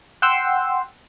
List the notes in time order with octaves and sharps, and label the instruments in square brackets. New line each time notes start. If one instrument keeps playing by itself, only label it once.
[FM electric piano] F#5 G5 C6 E6